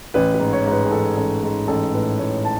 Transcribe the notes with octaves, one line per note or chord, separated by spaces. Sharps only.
A1 B4
B4
G#2
C#5
G#2
B4
G#4
A1 A4
A1 A4
G#2 A4
A1 A4
A2 B4
A2 C#5
A5